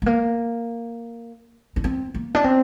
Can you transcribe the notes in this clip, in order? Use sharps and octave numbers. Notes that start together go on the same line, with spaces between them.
A3
A#3
D4
C4
A#3
D4
C4